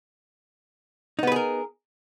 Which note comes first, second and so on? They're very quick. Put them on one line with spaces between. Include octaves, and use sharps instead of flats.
D#4 B3 B4 G#4 A#4